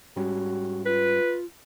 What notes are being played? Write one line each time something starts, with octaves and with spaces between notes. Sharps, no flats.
G#2 G3 C#4 F#4
F4 B4